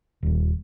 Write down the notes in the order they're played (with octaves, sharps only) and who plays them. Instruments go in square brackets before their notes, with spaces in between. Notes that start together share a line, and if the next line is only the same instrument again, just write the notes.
[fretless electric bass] D#1